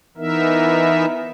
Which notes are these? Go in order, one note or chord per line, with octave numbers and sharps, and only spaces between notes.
E3 B3 D#4 A#4 E5